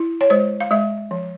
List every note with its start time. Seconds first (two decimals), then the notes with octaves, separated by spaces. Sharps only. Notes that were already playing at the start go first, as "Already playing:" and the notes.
Already playing: E4
0.21 C#5
0.30 G#3 C5
0.60 F5
0.71 G#3 E5
1.11 F3